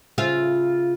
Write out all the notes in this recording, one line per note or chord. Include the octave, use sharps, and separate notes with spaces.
C#3 F4 E5